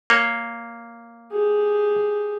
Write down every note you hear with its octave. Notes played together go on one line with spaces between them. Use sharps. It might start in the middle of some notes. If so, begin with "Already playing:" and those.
A#3 C#5
G4 G#4